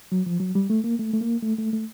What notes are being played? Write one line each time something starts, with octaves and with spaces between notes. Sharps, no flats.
F#3
F3
F#3
G3
A3
A#3
A3
A3
A#3
A3
A3
A3